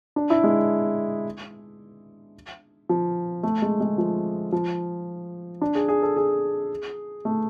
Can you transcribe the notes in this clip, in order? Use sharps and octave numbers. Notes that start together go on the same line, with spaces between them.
D4
E4
G#3
F3
A3
G#3
G#3
F3
F3
D4
G#4
G#4
A4
G#4
A3